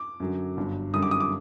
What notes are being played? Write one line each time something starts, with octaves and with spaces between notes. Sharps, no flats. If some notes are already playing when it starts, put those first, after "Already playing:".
Already playing: D6
F#2 D3 F#3
G1 G2 F#3
F#2 D3 G3 D#6
D6
D#6
D6